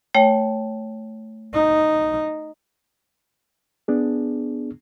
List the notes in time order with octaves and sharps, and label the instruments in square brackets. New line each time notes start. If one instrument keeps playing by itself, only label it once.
[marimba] A3 C#5 G5
[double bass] D#4
[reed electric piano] B3 D4 G#4